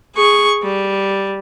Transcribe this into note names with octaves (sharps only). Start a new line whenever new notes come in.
G#4 C#6
G3